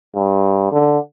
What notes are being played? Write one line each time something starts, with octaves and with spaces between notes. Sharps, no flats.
G2
D3